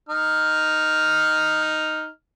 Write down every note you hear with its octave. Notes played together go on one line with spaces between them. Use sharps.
D#4 F6